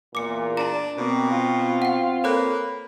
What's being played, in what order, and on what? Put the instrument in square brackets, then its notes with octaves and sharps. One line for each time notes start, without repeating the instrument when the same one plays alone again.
[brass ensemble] E2 A#2 [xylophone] D6 C#7
[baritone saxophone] D4 [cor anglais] D5 [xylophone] A5 A#5
[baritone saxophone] B2 [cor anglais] A#3 [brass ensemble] C4
[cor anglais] F4
[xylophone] F#5 G5
[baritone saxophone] A#3 [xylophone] A4 C#5 F#6 [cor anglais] B4